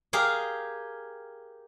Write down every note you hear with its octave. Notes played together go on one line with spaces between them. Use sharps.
G4 G#4 A#4 F5